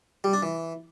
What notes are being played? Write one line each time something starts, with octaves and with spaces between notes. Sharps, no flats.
G3
D4
E3